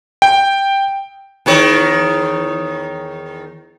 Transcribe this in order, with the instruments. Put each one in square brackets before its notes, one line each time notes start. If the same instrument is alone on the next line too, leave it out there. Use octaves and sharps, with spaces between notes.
[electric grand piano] G5
[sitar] E2 D#3 C#5